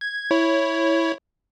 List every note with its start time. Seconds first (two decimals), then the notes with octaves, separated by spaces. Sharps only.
0.01 G#6
0.31 E4 C#5